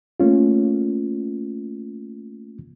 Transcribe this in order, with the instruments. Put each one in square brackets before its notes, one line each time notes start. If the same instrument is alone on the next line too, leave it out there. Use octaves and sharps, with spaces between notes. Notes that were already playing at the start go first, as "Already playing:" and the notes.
[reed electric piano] A3 A#3 C#4 F4